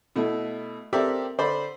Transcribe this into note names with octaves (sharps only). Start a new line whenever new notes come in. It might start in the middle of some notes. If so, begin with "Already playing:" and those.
B2 A3 E4
C4 G4 A4 A#4 D5 E5
D3 C5 D5 B5